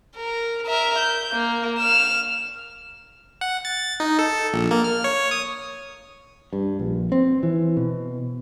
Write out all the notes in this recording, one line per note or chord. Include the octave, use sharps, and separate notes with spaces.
A#4
A#4 E5
G6
A#3
F6 E7
F#5
A6
D#4
A4
A#1
A#3
F6
C#5
D#6
G2
A#1
C4
E3
B2